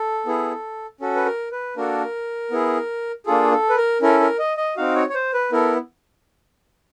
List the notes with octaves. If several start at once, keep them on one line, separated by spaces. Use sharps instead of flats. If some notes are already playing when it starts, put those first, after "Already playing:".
Already playing: A4
B3 E4 G#4
C#4 F#4 A4
B4
A#4
B4
A#3 D4 F#4 A4 A#4
B3 E4 G#4
A#3 D4 F4 G#4 A4
A4
B4
A#4
C#4 E4 A4 A#4
A#4
D#5
D#5
C4 D#4 F#4 F5
C#5
C#5
C5
B4
B3 E4 A4 A#4